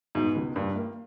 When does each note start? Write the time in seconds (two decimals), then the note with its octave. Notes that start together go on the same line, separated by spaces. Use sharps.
0.15 G#2 B2
0.35 C#2
0.55 G2 A#3
0.76 A#3